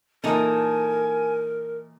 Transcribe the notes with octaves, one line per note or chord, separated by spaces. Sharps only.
A#2 E3 D#4 A4 A#4 G#5